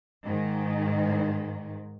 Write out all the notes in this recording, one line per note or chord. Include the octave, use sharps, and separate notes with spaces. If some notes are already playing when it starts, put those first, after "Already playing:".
G#2 D#3